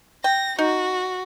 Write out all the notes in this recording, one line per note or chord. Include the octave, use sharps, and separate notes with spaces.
G5 A#6
D#4 F#4